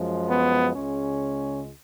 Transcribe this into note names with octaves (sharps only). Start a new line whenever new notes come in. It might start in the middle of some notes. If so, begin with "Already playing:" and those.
Already playing: F#2 F3 G#3
B3
C#2 C#3 G#3 C#4